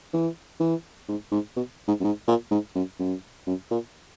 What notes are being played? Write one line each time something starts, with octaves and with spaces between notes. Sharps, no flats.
E3
E3
G#2
G#2
B2
G#2
F#2
G#2
A#2
G#2
F#2
F#2
F#2
A#2